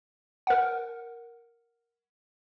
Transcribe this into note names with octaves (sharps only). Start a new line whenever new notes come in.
A#4 F#5